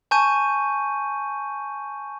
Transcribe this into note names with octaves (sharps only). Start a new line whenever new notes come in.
G#5 A5 C#6 G6 D#7